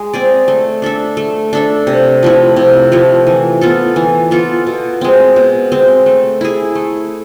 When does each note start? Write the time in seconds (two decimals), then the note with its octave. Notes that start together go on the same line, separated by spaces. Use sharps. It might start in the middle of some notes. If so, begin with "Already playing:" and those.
Already playing: G#3
0.14 C4 G#4 D5
0.48 A3
0.82 D4 A4 E5
1.17 A3
1.53 D4 A4 E5
1.87 C3
2.23 F3 A3 E4
2.57 C3
2.92 F3 A3 E4
3.27 E3
3.61 B3 F4 A4
3.96 E3
4.31 B3 F4 A4
4.67 B2
5.01 G#3 C4
5.36 B2
5.72 G#3 C4
6.06 A3
6.41 E4 G#4
6.75 A3